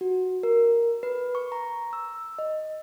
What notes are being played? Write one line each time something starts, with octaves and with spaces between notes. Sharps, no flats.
F#4
A#4
B4
C#6
A#5
E6
D#5